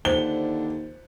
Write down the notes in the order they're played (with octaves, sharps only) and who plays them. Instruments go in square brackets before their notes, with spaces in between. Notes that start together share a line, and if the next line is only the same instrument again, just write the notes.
[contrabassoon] D#2 [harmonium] D3 D4 [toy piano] F4 C5 A#5 [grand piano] G7